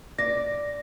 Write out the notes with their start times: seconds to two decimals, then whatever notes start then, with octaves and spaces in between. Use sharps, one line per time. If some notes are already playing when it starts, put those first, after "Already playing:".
0.19 D5 A#6